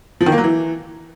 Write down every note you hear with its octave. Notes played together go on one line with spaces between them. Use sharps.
F3
D#3
A#3
F#3
E3